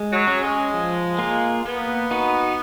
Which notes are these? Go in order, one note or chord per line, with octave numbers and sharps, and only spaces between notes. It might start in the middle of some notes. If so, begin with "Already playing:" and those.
Already playing: G#3
F#3
C#4 G#4 C#5
G#3
F3
A#3 F4 G#4
A#3 B3
D#4 F#4 B4